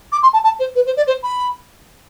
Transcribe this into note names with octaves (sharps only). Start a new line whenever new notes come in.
D6
C6
A5
A5
C5
B4
C5
D5
C5
B5